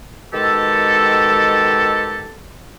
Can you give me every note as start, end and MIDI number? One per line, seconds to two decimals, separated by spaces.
0.33 2.34 47
0.33 2.34 51
0.33 2.34 56
0.33 2.34 67
0.33 2.34 69